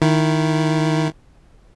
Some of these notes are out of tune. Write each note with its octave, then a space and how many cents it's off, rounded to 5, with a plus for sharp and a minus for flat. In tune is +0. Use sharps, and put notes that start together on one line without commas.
D#3 +0 E4 +0